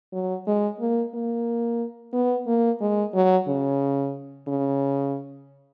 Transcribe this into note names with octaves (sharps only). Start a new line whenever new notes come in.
F#3
G#3
A#3
A#3
B3
A#3
G#3
F#3
C#3
C#3